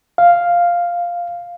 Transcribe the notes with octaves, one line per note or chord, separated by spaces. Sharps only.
F5